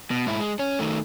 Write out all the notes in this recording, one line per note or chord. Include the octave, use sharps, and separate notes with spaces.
B2
G#2 E4
G#3
C#4
D#3 A3